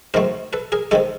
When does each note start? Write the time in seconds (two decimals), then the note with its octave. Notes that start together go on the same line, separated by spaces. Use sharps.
0.14 G#2 D#3 F#3 A3 C4 A#4 C5
0.53 A4 B4
0.72 G#4 A#4
0.91 C3 D#3 G#3 G4 A4